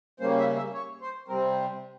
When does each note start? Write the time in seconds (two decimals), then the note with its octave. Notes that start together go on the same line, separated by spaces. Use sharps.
0.20 C#3 G3 A#3 C#4 C5
0.39 E5
0.56 E5
0.74 C#5
1.01 C5
1.28 C3 G3 C4 A#4